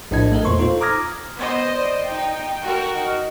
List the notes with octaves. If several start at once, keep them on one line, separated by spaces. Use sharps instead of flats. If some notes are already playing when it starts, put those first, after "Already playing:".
A#1 A2 D4 E4 D#5 G#6
A3 A4 A#4 D#5
E2 A#2 C5 C6 C#6
D#4 F4 A4 C5
A#5 D6 D#6 F6 G#6 A#6
B3 C5 D#5
D5
D#4 G5
F#4 A#4
D#4